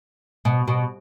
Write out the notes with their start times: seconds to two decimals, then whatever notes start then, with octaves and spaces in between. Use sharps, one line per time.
0.45 B2
0.68 B2